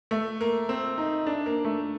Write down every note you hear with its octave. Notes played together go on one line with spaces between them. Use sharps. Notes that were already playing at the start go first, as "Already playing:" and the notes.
A3
A#3
C4
D#4
D4
A#3
A3